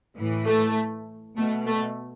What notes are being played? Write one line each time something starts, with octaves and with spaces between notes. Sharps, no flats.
A2 E3
A3
B2 A3
A3